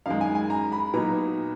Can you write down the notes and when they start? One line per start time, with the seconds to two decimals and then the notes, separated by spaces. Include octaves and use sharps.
0.06 F#2 D#3 G#3 F5
0.21 G#5
0.35 G#5
0.50 A#5
0.72 B5
0.93 A#2 F#3 B3 D#4 A#5